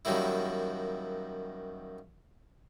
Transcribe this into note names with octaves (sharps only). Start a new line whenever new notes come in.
F#2 D#3 F#3 G3 A#3 E4